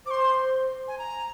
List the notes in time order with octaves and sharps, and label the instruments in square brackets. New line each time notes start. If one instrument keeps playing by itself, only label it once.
[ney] C5 [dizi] C6 D6
[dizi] G#5
A#5